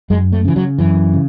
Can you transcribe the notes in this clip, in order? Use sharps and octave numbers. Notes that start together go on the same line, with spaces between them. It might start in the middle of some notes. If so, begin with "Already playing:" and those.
F#2 G#3
A3
C#3 E3
F#3
F#2 E3
C#3